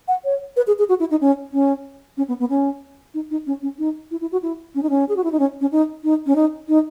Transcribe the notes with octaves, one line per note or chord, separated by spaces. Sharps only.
F#5
C#5
B4
G#4
G#4
F#4
E4
D#4
C#4
C#4
C#4
B3
B3
C#4
D#4
D#4
C#4
C#4
D#4
E4
E4
F#4
E4
C#4
D#4
C#4
G#4
F#4
E4
D#4
C#4
C#4
D#4
D#4
C#4
D#4
D#4